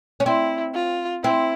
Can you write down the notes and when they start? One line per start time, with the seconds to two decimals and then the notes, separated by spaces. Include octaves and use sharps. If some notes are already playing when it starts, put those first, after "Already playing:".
0.20 C#4
0.26 C4 E4
0.74 F4
1.24 C4 E4